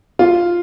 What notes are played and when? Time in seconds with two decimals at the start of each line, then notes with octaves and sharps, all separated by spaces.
0.19 F4